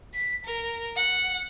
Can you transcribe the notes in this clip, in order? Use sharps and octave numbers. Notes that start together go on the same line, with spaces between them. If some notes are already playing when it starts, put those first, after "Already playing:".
B6
A#4
F#5